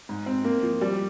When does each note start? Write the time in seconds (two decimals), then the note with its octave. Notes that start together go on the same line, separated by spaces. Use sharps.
0.09 G#2
0.26 C4
0.45 A#3
0.63 F3
0.81 G3